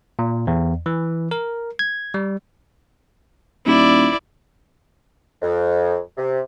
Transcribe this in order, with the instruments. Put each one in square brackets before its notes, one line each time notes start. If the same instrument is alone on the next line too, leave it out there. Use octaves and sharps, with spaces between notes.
[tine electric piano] A#2
E2
E3
A#4
G#6
G3
[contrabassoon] D#1 [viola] E4 D5
[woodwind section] F2
C3